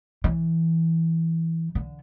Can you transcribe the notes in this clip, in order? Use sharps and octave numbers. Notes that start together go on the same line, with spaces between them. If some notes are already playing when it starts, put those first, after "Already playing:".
E3
D3